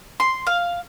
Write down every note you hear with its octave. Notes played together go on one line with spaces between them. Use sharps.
C6
F5